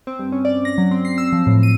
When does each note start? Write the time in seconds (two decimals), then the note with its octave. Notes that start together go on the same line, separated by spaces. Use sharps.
0.07 C4
0.19 G2
0.32 C#4
0.45 D5
0.65 A#6
0.78 F#3
0.91 C4
1.05 C7
1.18 E6
1.33 F3
1.47 A2
1.63 D#7